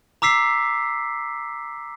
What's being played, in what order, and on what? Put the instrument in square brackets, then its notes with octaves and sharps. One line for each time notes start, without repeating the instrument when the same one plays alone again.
[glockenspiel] A#5 D6 E6 B6 C7